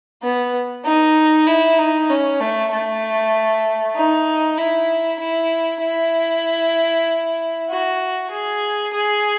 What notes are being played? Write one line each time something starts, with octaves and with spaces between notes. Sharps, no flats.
B3
D#4
E4
D#4
C#4
A3
A3
D#4
E4
E4
E4
F#4
G#4
G#4